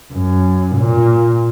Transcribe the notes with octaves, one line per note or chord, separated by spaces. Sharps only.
F#2
A#2